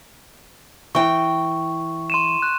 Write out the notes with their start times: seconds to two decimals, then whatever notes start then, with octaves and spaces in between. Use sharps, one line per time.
0.95 E3 G5 C#6
2.10 C6 D#7 E7
2.42 F#6